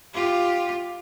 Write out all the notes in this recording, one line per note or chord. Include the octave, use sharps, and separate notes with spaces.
F4 G4